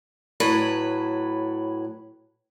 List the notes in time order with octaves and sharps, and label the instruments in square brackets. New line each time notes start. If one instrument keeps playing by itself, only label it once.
[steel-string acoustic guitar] A2 F#3 B4